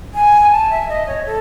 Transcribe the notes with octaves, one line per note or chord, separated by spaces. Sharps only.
G#5
A5
E5
D#5
C#5
A4